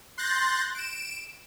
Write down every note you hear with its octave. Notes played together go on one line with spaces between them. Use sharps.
C6 F#6 G6 A6 A#6
D7 E7